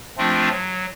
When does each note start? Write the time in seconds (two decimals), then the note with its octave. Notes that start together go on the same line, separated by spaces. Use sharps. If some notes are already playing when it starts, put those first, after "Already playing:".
0.18 F3 A3 C4 D4 F4
0.51 F#3